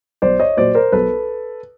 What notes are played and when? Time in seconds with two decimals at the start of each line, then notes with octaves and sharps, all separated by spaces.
0.22 B1 C5 D5
0.40 C#5 D#5
0.57 A#2 F#3 C5 D5
0.75 A#4 C5
0.92 B1 A4 B4